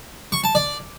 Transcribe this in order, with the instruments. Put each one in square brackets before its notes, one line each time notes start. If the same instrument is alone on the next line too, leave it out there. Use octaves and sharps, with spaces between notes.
[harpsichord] C#6
A5
D5